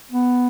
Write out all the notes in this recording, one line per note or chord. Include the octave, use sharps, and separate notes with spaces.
B3